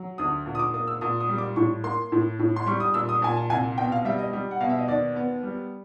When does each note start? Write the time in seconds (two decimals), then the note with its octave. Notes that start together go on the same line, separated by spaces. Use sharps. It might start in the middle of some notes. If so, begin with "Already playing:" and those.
Already playing: F#3
0.18 D2 D#6
0.46 A#2
0.55 D#6
0.59 D6
0.74 A#3 D#6
0.87 E6
1.01 A#2 D#6
1.20 D#6
1.29 G3
1.38 D6
1.56 A2 C#6
1.84 A#3 C6
2.12 A2
2.39 A2
2.56 C6
2.66 G3 C#6
2.80 D#6
2.94 A#2 E6
3.09 D#6
3.22 A#2 G#5
3.36 A5
3.50 C2 G#5
3.77 B2 G5
3.92 F5
4.05 G3 E5
4.18 D#5
4.33 G3
4.51 F#5
4.60 B2 F5
4.69 E5
4.79 D#5
4.88 D#2 D5
5.16 B3
5.43 G3